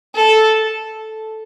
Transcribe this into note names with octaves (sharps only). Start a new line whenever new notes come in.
A4